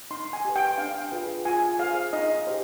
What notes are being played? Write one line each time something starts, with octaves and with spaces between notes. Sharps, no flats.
D#4 C6
G#5
G4 B4
G5
D4 F5
F4 G#4 B4
F4 G#5
G#4 C5 F5
D#4 D#5
G4 C5